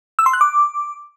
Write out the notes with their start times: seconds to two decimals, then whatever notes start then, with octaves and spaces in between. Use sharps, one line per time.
0.19 E6
0.26 C6
0.33 F#6
0.41 D6